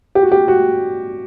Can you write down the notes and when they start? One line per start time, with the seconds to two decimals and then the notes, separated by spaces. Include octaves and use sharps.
0.15 G4
0.22 F#4
0.32 G4
0.48 F#4